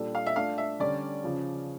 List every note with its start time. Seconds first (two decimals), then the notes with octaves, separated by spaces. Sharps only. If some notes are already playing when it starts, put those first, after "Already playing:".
Already playing: A#2 G3 D4 A4
0.15 F5
0.26 E5
0.36 A3 D4 F4 A4 F5
0.58 E5
0.80 D3 G3 C#4 D5
1.24 C#3 F3 C#4